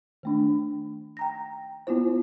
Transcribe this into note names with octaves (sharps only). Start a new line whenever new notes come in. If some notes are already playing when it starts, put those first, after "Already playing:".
D#3 A3 D4
G5 A#5 A#6
B3 E4 F4 C5